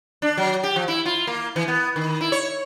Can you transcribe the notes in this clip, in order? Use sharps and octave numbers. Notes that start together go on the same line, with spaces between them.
D4
F#3
G4
F3
E4
F4
A#3
E3
B3
D#3
E4
C#5